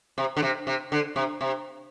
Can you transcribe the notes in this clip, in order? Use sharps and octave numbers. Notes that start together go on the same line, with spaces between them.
C3
D3
C3
C3
D3
C3
C3